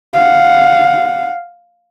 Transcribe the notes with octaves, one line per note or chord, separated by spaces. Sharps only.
F5 F#5